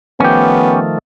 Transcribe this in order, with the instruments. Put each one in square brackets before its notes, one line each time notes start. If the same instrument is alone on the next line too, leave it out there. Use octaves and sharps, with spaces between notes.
[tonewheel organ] D#3 F3 A3 [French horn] B3 [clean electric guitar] C#4 G4